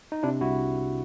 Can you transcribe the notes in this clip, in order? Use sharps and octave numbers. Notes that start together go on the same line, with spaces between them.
D#4
C3 D4 E4
C2 E4 F#4